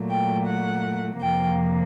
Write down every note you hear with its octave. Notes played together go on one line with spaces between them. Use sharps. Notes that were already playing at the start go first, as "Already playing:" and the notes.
Already playing: A#2 F#3 A3
G5
F#5
F2 C3 F3 A#3 G5